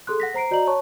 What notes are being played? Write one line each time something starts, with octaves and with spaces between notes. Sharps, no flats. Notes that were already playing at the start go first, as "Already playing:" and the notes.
G#4 A4 C6 F#6
F#5 A#6 B6
C5 A#5 C7 D7
F#4 D5 D#5 A#5 F#7
C#5 A5 C#6